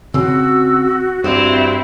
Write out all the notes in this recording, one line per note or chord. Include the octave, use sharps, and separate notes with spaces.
C#3 C4 F#4 E6
G2 C4 E4 F#4 E7